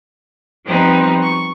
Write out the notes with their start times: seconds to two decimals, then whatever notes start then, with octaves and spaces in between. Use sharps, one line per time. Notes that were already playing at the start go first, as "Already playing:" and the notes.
0.66 F3 G3 B3 C4 D#4
1.22 C#6